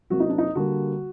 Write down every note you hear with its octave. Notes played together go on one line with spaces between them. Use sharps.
C3 F#3 A#3 F#4
D#4
D4
D#4
D3 G3 A#3 F#4